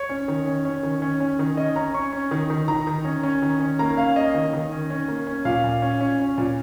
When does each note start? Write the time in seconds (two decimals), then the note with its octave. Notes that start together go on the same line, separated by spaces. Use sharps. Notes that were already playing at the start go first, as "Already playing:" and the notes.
Already playing: C#5
0.09 C#4
0.28 D#3
0.46 C#4
0.65 C#4
0.83 D#3
1.02 C#4
1.20 C#4
1.39 D#3
1.57 C#4 D#5
1.76 C#4 A#5
1.94 C#4 C#6
2.13 C#4
2.31 D#3
2.50 D#3
2.68 D#3 A#5
2.87 D#3
3.05 C#4
3.23 C#4
3.42 D#3
3.60 C#4
3.79 A#3 A#5
3.97 C#4 F5
4.16 A#3 D#5
4.34 D#3
4.53 D#3
4.72 C#4
4.90 C#4
5.08 A#3
5.27 C#4
5.45 A#2 F5
5.64 A#2
5.82 C#4
6.01 C#4
6.19 C#4
6.38 A#2